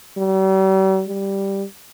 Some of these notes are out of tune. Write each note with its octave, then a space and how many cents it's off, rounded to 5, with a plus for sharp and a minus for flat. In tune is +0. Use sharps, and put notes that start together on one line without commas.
G3 -45
G3 +0